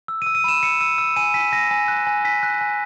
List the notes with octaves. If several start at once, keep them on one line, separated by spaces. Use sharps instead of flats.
E6
D#7
E6
D#7
B5 E7
E6 C#7
E6 D#7
E6
G#5 D#7
G#5 B6
G#5 A#6
G#5
F#6
G#5
G#5 B6
F#6
G#5